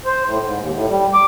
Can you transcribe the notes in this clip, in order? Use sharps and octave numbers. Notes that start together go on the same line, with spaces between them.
C5
A2
G#2
D#2
A2
G3
D6